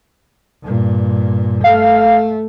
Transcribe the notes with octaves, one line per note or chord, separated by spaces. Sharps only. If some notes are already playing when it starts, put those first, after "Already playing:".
G2 A#2
A3 F5